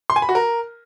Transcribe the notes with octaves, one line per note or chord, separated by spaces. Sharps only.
C6
G#5
B5
F#4
A#4